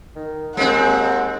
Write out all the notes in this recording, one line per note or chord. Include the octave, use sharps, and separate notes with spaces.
D#3
D#2 G#3 C4 F#5